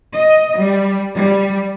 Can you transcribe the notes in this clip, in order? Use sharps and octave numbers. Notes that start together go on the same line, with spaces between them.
D#5
G3
G3